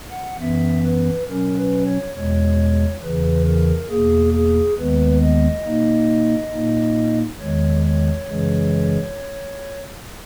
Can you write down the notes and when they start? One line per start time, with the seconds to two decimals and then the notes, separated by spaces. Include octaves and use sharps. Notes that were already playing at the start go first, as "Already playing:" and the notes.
0.10 F#5
0.39 F#2 E3 B3 E5
0.84 B4
1.28 B2 F#3 C#4 A#4
1.57 B4
1.86 C#5
2.15 E2 B2 G#3 C#5
3.02 E2 C#3 E3 B4
3.47 A#4
3.89 E2 B2 A#3 G#4
4.34 G#4
4.77 D#2 D#3 G#3 B3 B4
5.22 D#5
5.65 B2 A#3 D#4
6.52 A#2 A#3 D#4
7.40 E2 D#3 G#3 C#5
7.84 C#5
8.28 F#2 C#3 E3 G#3